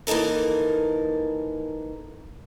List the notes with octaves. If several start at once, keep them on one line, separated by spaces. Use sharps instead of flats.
E3 A#3 D#4 A4 A#4